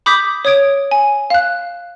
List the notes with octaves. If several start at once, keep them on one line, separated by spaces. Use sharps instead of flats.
B5 D6 D#6 G6 B6
C#5 D#6 G#6 D7
G#5
F5 F#6